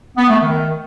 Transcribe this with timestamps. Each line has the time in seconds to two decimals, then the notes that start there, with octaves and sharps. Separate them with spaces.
0.18 B3
0.29 A3
0.41 D#3